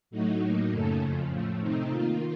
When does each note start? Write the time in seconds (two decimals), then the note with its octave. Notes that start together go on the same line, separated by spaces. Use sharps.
0.11 A2 F#3 A3 D#4 F#4
0.40 A2 F#3 A#3 D#4
0.70 F#2 C#3 A3 C#4 A4
1.00 F2 C#3 F3
1.30 A2 F3 A3
1.60 C3 D#3 A3 C4 D#4
1.89 D#3 A#3 F4